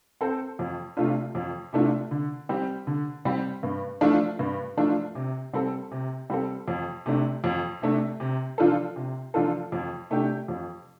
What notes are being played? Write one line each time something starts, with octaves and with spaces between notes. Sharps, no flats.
C4 A4 C5
F2
C3 A3 D4 F4
F2
C3 A3 D4 F4
D3
G3 C4 G4
D3
G3 C4 G4
G2
F3 A3 D4 F4
G2
F3 A3 D4 F4
C3
G3 C4 A4
C3
G3 C4 A4
F2
C3 A3 D4
F2
C3 A3 D4
C3
F3 D4 F4 A4
C3
F3 D4 F4 A4
F2
C3 A3 D4 G4
F2